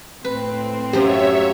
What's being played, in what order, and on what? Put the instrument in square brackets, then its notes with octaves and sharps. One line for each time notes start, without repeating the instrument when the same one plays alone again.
[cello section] A2 C4 [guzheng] B4
[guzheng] F#2 F3 F4 [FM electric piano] G4 [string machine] C#5 E5